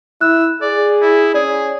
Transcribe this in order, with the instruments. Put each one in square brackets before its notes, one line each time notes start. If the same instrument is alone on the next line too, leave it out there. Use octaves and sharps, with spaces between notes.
[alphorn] E4 [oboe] E6 [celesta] F#6
[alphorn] G#4 [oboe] D5
[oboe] E4
[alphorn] C#4 [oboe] G#4 [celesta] D5